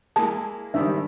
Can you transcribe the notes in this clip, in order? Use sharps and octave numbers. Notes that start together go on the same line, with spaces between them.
G#3 A#3 E4 A5
G#2 D#3 G3 D4 E5